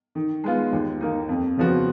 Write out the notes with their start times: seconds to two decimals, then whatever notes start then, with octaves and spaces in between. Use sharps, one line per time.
0.15 D#3
0.44 G#3 B3 F4
0.72 D#2
1.01 D#3 A#3 D#4
1.29 F2
1.57 C#3 F3 B3 F#4